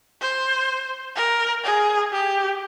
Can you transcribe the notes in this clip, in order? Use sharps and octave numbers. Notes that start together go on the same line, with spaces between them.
C5
A#4
G#4
G4